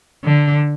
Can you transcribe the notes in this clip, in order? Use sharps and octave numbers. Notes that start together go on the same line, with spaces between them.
D3